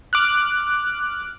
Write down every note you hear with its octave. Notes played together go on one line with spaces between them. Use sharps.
D6 F6 F#6